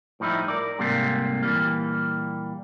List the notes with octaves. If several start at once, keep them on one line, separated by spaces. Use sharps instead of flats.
A2 F3 G3 D#4 E4
A#4 D5
G#2 C3 G3 A3 A#3
A#2 E3 G3 A#3